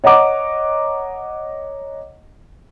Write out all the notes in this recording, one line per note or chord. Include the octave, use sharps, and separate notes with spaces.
C#5 D#5 F#5 A#5 D6